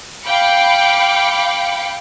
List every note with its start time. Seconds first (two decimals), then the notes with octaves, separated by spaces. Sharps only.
0.24 F5 G5 B5 D6 C#7